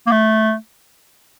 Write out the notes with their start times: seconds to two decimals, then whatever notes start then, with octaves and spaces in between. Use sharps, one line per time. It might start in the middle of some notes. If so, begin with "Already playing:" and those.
0.07 A#3
0.12 A3